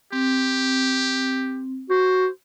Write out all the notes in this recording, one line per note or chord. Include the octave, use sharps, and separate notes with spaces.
C4 G4
F#4 C5